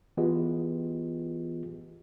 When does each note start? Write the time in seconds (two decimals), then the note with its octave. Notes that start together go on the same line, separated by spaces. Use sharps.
0.17 E3 B3 F4 G4 G#4 D#5